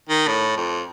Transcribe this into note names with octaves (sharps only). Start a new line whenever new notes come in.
D#3
A2
F2